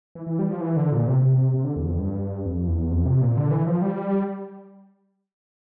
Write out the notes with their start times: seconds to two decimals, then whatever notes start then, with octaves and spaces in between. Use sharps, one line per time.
0.15 E3
0.27 E3
0.39 G3
0.50 F3
0.61 E3
0.77 D3
0.92 A#2
1.07 C3
1.22 C3
1.38 C3
1.54 C3
1.64 D3
1.76 E2
1.87 F2
1.99 G2
2.45 F2
2.67 E2
2.91 F2
3.05 C3
3.21 A#2
3.37 D3
3.51 E3
3.66 F3
3.82 G3